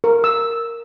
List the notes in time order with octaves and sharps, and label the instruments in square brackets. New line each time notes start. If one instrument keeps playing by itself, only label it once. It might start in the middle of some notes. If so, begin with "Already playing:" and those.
[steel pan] A#4
E6